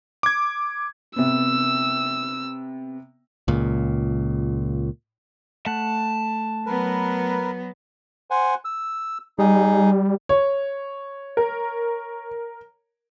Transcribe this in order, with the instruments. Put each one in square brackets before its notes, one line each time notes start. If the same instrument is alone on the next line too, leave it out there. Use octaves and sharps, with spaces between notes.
[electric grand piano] D6 G#6
[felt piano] C3 B3 [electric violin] E6
[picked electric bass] C#2 A#2
[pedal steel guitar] A3 F#5 [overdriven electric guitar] A5
[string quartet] F#3 B3 [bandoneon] A#4 B4
[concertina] C5 F#5 G#5
E6
[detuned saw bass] G3 [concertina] D#4 G#4
[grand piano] C#5
[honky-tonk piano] A#4